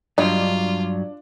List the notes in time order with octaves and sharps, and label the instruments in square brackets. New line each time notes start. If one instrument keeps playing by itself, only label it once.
[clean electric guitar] G2 F#3 [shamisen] G3 D#5 [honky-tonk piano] D4 [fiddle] F4